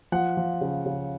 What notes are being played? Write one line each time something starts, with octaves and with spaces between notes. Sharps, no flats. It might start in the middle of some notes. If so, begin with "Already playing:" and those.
F3 F#5
F3
C#3
C#3